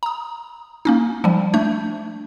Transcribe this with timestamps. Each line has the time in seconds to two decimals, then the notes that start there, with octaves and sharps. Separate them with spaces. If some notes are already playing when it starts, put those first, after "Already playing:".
0.03 A#5 D#6
0.85 A#3 C#4 D#4
1.24 F3 G3
1.54 A3 D4 G6